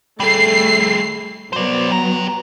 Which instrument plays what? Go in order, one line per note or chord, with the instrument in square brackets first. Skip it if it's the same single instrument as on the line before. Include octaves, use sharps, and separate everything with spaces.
[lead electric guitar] G3 G#4 [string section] A3 C7
[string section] F#3 B3 [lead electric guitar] C5 D5
[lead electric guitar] G4 A#5